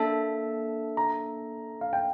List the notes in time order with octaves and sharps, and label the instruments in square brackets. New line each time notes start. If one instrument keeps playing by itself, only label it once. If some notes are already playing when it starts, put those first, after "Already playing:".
Already playing: [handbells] A#3 D4 A4 E5 [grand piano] A5
[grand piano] A#5
F5
G5